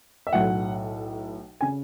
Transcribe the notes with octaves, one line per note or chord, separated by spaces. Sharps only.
E5
B1 A2 F#3 F#5
C#3 G#5